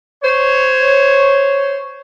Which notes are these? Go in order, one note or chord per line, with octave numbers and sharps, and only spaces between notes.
C5 C#5